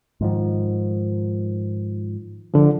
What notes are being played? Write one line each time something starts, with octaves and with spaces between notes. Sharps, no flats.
G#2 D#3 F3
D3 F3